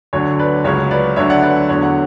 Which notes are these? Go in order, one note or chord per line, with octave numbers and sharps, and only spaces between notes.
D2 D3 F#3 C#5
B4 D5
C#2 C#3 F#3 C#5
B4 D5
D2 D3 F#3 C#5 E5
D5 F#5
B4 D5
E2 D3 F#3 C#5
F#5